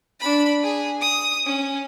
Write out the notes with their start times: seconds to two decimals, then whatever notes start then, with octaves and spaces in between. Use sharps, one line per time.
0.20 D4 B5
0.63 G#4
1.01 D#6
1.46 C#4